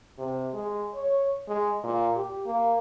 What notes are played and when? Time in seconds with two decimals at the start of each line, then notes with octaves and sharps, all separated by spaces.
0.18 C3
0.54 G#3
0.95 C#5
1.49 G#3
1.84 A#2
2.16 G4
2.46 A#3